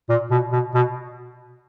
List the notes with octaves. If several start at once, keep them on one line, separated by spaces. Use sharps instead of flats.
A#2
B2
B2
B2